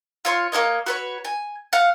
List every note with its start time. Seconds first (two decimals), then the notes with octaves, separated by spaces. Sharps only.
0.25 F4 C#5 C6
0.52 A#3 F#4 C#5 D#5
0.86 F#4 B4 C#5
1.25 G#5
1.73 F5 F#5